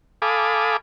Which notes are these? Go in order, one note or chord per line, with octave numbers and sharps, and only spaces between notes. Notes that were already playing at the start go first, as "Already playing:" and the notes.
A4 F5 G#5 B5 D6 D#6